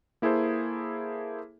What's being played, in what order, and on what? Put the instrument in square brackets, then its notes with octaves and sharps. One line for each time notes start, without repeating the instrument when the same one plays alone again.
[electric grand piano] A#3 E4 G#4 A4 C5